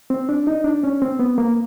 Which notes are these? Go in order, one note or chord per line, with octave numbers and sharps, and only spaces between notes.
C4
D4
D#4
D4
C#4
C4
B3
A#3